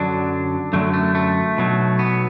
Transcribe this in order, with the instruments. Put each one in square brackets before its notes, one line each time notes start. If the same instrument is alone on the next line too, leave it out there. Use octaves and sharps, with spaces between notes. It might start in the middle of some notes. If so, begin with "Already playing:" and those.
Already playing: [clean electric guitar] F#2 D3 F#3 D4
F#2 D3 F#3 A3
A3
A3
B1 B2 F#3
B3